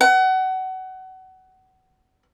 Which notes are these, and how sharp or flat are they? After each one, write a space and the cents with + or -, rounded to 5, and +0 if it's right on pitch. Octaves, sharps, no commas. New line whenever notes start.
F#5 +25